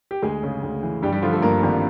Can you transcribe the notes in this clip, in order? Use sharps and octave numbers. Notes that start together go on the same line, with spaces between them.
G4
D2 G#3 G#4
C#3
D2
E3
G2 G3 G4
G3 G4
D3 F3 F4
A3 A4
G2 A#3 A#4
G#1